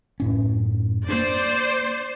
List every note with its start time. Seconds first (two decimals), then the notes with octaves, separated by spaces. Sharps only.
0.20 F#2 A2 C#4
1.09 A#3 D4 C5 D5